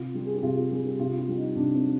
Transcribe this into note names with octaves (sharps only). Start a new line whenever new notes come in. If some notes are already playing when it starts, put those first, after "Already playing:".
Already playing: C3 F4
G3
G#4
G4
C3 F4
G4
G3 G#4
G4
C3 F4
F4
G3
D#4
C3 D4
C4
G3